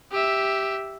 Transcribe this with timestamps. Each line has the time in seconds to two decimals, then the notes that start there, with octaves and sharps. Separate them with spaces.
0.11 G4 E5